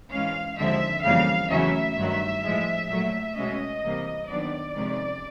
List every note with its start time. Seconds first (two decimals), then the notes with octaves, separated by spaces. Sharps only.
0.11 G#2 E3 G#3 C#4 F5
0.57 D#2 D3 F3 G#3 C4 E5
1.04 F2 C#3 E3 G3 A#3 F5
1.51 E2 C#3 F#3 A3 C#4 E5
1.97 G2 D#3 F#3
2.44 A2 F3 G#3
2.89 A#2 F#3 A3
3.36 B2 G#3 C#4 D#5
3.83 C3 E3 G3 A#3
4.29 D#2 D#3 F#3 B3 D4 D5
4.75 F2 C3 D#3 G#3 C#4